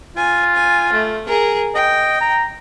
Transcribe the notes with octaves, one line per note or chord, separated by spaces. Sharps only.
F4 G#5
G#5
A3
G#4 A#4
D#5 G5
A#5